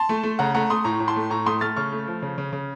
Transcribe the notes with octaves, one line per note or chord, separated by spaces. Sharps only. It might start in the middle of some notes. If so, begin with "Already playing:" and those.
Already playing: A5 C6
A3
A3
C#3 F#5 A#5
A3 F#5 A#5
A3 C6 D#6
A2 A#5 C#6
A2
A5 C6
A3
A2 A#5 C#6
A3 C6 D#6
A3 F6 A6
C#3 C#6 F6
A3
F3
C#3
C#3
C#3